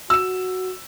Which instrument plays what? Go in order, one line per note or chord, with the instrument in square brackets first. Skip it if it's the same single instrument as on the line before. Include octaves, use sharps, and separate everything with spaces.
[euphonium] F#4 [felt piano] E6 E7